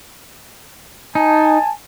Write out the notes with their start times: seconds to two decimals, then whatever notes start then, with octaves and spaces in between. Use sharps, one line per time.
1.15 D#4 G#5 A5